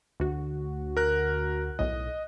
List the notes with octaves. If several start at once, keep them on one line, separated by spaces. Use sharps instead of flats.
D2 F#4
A#4 F#6
B1 A2 D#5